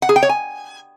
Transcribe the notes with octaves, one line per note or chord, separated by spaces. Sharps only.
F#5
G#4
G5
C#5
G#5